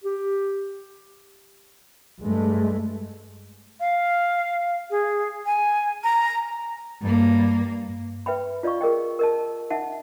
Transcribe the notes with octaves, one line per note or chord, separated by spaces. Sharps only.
G4
G2 G#3 A3
F5
G#4
G#5
A#5
G2 A#3
B4 E5 G5 B5
F4 D5 D#5 F5 C#6
G#4 A#4 D#5 G5
A#4 D#5 A5
D#4 D#5 E5 F#5 A5